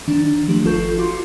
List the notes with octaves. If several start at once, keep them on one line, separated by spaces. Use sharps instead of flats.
D#3 D4
F3 A3 G4
G1 F4 A4 B4 C#6 G6
F4 F#4 C6 D6